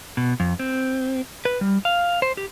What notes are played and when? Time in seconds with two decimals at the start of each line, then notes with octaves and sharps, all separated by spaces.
0.17 B2
0.40 F2
0.59 C4
1.45 B4
1.61 G3
1.85 F5
2.22 C5
2.37 G4